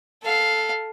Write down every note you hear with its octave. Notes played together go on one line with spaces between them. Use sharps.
A4 F5